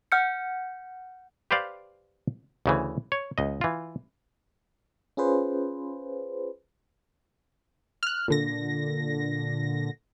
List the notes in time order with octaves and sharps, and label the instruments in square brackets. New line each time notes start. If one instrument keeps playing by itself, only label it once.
[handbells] F#5 F6 G6 C#7
[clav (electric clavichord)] G4 B4 C5 D5 F5
D2 C#3 E3
C#5
C#2 D#5
E3 F4
[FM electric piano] C#4 F4 G#4 B4 C5
[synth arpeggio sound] F6 F#6
A#2 D3 A#6